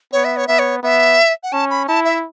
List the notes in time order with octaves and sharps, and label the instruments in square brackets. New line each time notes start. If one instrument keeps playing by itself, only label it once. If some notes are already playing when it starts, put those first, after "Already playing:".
[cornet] B3 [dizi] C#5
[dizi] E5
C#5
[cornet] B3 [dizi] E5
[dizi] C#5
[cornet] B3 [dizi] E5
[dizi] F#5
[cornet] C#4 [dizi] A5
[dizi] B5
[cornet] E4 [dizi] A5
[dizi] E5